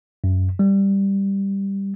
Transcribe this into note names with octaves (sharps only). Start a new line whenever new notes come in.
F#2
G3